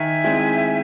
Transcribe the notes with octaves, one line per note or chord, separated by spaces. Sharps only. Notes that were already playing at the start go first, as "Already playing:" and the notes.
Already playing: D#3 E5 G#5
G#3 C4 E4